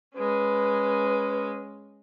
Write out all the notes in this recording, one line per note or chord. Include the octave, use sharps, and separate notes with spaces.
G#3 C#4 B4